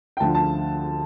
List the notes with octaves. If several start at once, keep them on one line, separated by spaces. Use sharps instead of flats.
G5
D2 D3 F3 A5
A5